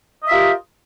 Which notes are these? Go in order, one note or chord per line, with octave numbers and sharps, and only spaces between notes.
F4 G4 A#4 D#5 E5